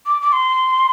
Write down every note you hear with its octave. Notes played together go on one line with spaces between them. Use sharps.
D6
D6
C6